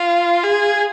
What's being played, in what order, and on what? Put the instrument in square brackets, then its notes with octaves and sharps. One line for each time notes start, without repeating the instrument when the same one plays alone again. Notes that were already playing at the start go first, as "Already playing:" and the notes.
Already playing: [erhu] F4
G#4